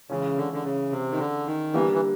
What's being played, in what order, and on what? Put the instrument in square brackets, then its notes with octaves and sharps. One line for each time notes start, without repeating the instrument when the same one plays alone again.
[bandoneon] C#3 [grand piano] E3 G#3 C#4 F4
[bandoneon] D3
D3
C#3
C3
D#3
D3
D#3
[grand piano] D3 G3 A#3 D4 G4 [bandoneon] E3
[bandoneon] E3